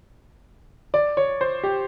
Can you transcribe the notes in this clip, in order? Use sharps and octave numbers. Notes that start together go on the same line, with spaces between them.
D5
C#5
C5
G4